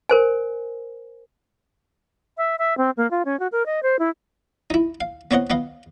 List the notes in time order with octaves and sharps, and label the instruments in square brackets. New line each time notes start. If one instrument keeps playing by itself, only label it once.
[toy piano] A#4 C5 G#5
[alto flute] E5
E5
C4
A#3
F4
C#4
F#4
A#4
D#5
C5
E4
[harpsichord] D#4 E4
F5
B3 C4 C#5 D#5 F#5
B3 B4 D#5 F5